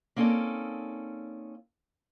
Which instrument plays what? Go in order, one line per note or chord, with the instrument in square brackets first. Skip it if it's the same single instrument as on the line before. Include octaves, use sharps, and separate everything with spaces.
[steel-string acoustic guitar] A#3 C4 C#4 D#4 A4 D5